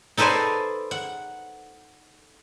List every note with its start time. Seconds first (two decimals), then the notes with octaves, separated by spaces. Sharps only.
0.17 D#4 A4 B4 C5 D5 G#5
0.91 F#5